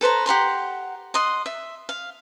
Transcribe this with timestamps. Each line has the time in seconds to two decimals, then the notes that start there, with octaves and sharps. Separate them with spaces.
0.01 A4 B4 C5 A#5
0.26 G4 F#5 A#5 C6
1.14 D#5 F#5 C6
1.46 E5
1.89 F5